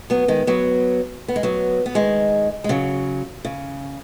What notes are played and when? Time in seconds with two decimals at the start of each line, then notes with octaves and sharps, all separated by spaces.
0.10 F#3 B3
0.28 D#3 G#3
0.47 F#3 B3
1.28 B3
1.36 G#3
1.43 F#3 B3
1.86 B3
1.95 D#3 G#3
2.64 G#3
2.69 C#3 F#3
3.45 C#3